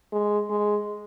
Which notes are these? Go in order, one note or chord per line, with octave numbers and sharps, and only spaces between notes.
G#3
G#3